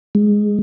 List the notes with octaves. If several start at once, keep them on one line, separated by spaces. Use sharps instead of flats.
G#3